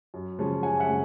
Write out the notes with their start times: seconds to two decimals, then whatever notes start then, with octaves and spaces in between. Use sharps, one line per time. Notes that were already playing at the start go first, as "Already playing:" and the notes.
0.14 F#2
0.39 C#3 F3 G#3 C#4
0.63 F#2 F#5 G#5
0.80 E5 F#5
0.88 C#3 F3 G#3 C#4